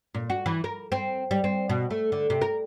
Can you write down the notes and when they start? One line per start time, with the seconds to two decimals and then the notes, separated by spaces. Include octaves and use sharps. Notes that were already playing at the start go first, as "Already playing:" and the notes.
0.14 A#2
0.30 F#4
0.46 E3
0.64 A#4
0.92 C4
1.31 G3
1.44 C4
1.69 B2
1.91 A3
2.12 D3
2.30 C3
2.41 A#4